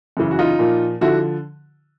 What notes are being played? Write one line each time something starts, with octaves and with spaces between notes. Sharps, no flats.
F#2 C#3 E3
F#4
D#4 F4
A#2 F3
D3 F3 E4 F#4